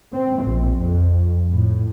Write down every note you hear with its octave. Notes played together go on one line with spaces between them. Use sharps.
C4
A#1
F2
A2